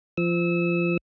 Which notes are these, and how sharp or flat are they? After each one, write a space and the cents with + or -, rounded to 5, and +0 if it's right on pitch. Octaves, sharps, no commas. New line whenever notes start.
F3 -20 E6 -25